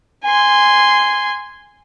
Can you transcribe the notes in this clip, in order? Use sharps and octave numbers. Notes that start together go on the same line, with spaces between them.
G#5 C6